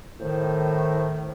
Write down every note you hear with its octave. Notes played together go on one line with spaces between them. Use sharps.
A2 D#3 C5